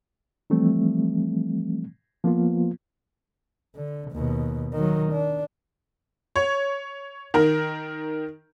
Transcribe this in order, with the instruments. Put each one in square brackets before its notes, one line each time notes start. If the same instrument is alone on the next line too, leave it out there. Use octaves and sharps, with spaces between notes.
[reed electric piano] E3 F3 G3 A3 C4
F3 A#3 B3 F4
[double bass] D3
D#2 B2
D#3 F#3
D4
[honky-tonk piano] C#5
D#3 A#4